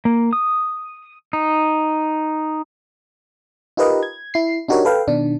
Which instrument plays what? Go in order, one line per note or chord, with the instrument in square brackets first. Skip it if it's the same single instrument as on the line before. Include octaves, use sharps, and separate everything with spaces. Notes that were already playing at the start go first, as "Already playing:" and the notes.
[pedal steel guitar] A#3
D#6
D#4
[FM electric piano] D#4 F4 G4 A#4 B4 D#5
G#6
E4 C7
D4 D#4 F#4 G4 A#4 C#5
A4 B4 F5 G5
B2 D#3 D4